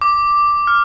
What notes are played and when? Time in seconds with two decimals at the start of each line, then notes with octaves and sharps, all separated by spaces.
0.01 D6
0.67 F6